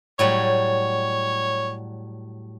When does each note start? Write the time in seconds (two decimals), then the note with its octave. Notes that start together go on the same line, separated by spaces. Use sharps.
0.19 A2 F#3 G3 C#5